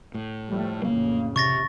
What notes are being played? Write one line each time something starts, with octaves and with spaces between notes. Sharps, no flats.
A2
F3 G3 A3
A1 F2 C#3 A#3
C3 C#6 A6 A#6